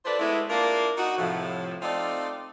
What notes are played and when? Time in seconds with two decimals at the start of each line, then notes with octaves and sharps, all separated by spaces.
0.05 D4 F4 A4 B4 C5 D5
0.19 G#3 A3 B3 E4
0.50 A#3 D4 E4 F4 A#4
0.97 D#4 F#4
1.18 A2 C3 F3
1.82 A3 C4 D#4 F4 A4 D5